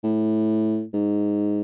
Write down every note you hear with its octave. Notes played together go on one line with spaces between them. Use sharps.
A2
G#2